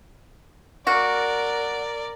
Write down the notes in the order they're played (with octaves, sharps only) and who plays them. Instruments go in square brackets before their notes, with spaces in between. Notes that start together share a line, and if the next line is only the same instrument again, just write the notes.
[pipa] A#3 F#4 [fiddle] A#4 D5